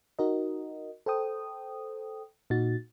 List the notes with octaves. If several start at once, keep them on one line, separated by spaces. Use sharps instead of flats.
D#4 F#4 A#4 D#5
A4 C5 G5 D#6
A#2 D#4 F#4 A6